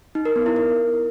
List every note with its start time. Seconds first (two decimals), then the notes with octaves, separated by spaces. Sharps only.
0.15 D#4
0.25 A#4
0.36 B3
0.46 E4
0.56 A#4